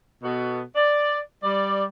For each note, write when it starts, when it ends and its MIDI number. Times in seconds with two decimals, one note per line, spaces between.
0.23 0.61 47
0.23 0.61 59
0.23 0.61 66
0.23 0.61 69
0.76 1.19 74
1.43 1.84 55
1.43 1.84 74